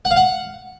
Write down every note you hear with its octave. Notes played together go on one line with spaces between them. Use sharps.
F#5
F5
F#5